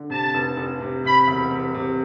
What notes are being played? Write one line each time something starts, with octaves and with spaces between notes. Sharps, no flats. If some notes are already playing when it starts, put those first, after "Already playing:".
Already playing: D3
C3 A5
F1
F1
C3
C3 B5
E1
C3
C3